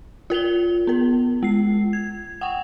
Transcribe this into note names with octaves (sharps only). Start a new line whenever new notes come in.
F4 A#4 F7 G7
B3 A#4
G#3 C7
G#6
F#5 G5 C#6